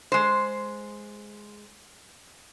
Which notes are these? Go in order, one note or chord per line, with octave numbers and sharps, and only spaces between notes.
G#3 C5